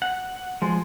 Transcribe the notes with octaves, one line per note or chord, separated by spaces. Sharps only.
F#5
F3 G#3